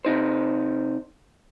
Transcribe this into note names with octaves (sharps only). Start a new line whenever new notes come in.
C3 D#4 C5